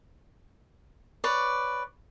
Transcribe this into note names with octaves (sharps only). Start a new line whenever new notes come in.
B4 C#5 D5